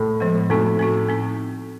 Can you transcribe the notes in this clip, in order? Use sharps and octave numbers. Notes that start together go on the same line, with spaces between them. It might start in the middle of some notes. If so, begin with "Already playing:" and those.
Already playing: A2
F3 G#3 B3
A2 C4 D#4 F#4
C4 D#4 F#4
C4 D#4